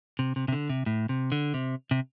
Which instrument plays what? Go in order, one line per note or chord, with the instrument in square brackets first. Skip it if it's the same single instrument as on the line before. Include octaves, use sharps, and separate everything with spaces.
[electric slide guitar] C3
C3
C3
D3
C3
A2
C3
D3
C3
C3